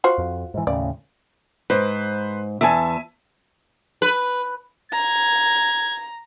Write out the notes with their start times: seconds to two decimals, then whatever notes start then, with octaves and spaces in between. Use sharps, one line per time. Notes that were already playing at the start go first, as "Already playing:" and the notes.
0.04 F4 F#4 C5
0.18 F2
0.54 G#2 E3
0.67 D#2 A2 C#3 D5
1.70 G#2 B4 C5
2.61 E2 E5 G#5 A5
4.02 B4
4.92 A#5 G#6